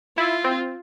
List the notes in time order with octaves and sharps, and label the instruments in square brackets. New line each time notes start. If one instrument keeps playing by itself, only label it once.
[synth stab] E4 [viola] F4
[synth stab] C4